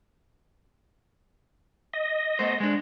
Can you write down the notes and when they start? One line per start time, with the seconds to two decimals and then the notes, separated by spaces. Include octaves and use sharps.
1.94 D#5
2.39 A3 B3 C5
2.60 G#3 D4